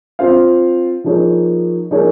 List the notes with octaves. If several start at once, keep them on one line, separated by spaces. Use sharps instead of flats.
C4 F4 C5 F5
F3 A#3 D#4 G#4 C#5
F3 A#3 D#4 G#4 C#5